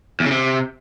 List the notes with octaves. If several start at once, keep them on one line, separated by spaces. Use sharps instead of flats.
E2
C#3
C3